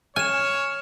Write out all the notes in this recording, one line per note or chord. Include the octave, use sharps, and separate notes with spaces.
C#5 G#5 F6 E7